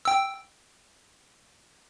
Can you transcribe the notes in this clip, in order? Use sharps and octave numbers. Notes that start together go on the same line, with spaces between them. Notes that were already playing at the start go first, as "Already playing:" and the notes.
G5 E6